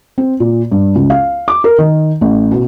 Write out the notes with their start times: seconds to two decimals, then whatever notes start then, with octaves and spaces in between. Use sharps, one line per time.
0.18 C4
0.40 A#2
0.72 G2
0.95 C#2
1.10 F5
1.48 D6
1.64 A#4
1.79 D#3
2.21 A1
2.51 B2